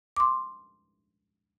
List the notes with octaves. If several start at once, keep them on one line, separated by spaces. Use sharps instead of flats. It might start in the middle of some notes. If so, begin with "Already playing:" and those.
C6 D6